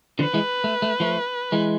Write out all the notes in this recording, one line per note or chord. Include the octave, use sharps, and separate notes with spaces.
D3 F3 B4
E3 G#3
A3
A3
F3 A3
E3 G#3